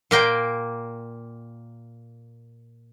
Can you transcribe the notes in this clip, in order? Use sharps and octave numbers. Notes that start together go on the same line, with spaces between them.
A#2 A#3 G5